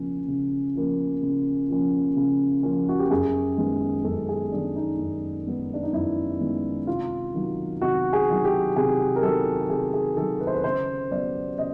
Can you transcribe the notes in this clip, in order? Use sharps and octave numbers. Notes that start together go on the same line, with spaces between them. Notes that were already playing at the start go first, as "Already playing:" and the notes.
Already playing: C#3 F3 A#3 C#4
C#3
F3 A#3 C#4
C#3
F3 A#3 C#4
C#3
F3 A#3 C#4
F#4
G4
F#2 G#4
D#3 G#3 B3
F#2 A4
G#4
D#3 G#3 B3 D4
D#4
F#2
D#3 G#3 B3
D4
D#4
F#2 E4
D#3 G#3 B3
C3 F4
D#3 F#3
C3 F#4
G#4
D#3 F#3
G4
C3 G#4
A#4
D#3 F#3 A4
C3 G#4
G#4
D#3 F#3 A4
B4
C5
B4
C#3 C5
F#3 B3 D5
C#3 D#5